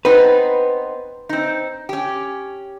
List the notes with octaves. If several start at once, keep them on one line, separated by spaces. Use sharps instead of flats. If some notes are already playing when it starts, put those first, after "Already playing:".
B3 C4 D#4 B4
C4 D#4
C#4 G4